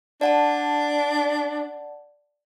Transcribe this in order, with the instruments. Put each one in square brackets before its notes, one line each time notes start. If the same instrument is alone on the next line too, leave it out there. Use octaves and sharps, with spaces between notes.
[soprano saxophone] D4 [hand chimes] D5 F#5 A5